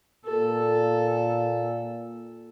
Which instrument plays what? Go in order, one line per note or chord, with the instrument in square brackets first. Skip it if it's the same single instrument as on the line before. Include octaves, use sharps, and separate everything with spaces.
[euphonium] A#2 [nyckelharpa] A4